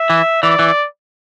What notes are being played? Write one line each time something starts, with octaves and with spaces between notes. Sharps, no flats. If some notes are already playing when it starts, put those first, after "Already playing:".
Already playing: E5
E3
E3 D5
E3